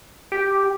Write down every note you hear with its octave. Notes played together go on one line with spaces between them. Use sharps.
G4